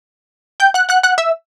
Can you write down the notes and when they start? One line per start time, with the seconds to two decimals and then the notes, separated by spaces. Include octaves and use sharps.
0.60 G5 G6
0.74 F#5 F#6
0.89 F#5 F#6
1.03 F#5 F#6
1.18 E5 E6